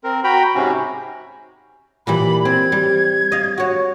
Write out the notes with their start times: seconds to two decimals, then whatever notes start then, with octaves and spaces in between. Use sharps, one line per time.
0.04 C4 A#4
0.24 F#4 G5 A#5 B5
0.55 G#2 C3 C#4 F#4
2.07 A#2 E3 G3 B5
2.45 C4 G#6
2.72 G3
3.32 D#5 F5
3.58 F#4 C#5